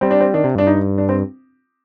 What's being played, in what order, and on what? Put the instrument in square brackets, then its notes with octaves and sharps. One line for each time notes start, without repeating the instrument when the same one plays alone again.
[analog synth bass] G3 [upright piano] C4
[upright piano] D4
C4
[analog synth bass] D#3 [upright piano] D4
[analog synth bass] C3
[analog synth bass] G2 [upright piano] D4
[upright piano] D#4
D4
C4